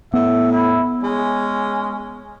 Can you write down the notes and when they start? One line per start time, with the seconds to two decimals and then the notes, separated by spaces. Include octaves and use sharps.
0.14 A2 B3 E5
0.52 E4
1.03 G#3 C#4